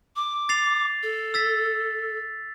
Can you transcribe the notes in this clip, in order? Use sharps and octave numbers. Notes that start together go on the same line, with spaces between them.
D6
A6 C7 F7
A4
E6 A6 B6